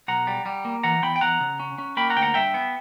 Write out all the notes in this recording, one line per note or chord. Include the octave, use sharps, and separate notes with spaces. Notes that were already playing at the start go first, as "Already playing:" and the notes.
B1 F#5 A#5
G3
G3
A#3
E3 F#5 A#5
E2 G5 B5
G5
E2 F#5 A#5
C#3
C#4
C#4
A#3 G5 B5
F#5 A#5
D2 G5
F#5 A#5
G2 E5 G5
B3